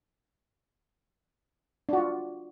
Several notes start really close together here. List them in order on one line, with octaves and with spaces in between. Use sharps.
D4 F#4 F4